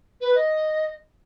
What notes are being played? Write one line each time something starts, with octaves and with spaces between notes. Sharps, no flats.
B4
D#5